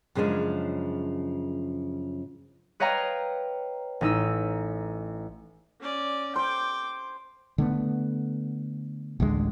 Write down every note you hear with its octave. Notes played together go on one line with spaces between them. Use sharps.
F#2 C#3 F3 G#3 B3 D4
B4 C#5 D#5 F5 G5 A#5
A1 D#4 E6
C#4 D5
C5 G5 D6
D3 A3 B3
A1 D2 D3 G#3